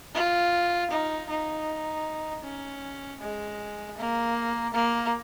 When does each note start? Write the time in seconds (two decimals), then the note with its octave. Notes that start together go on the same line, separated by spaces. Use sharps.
0.15 F4
0.91 D#4
1.29 D#4
2.44 C#4
3.21 G#3
3.98 A#3
4.73 A#3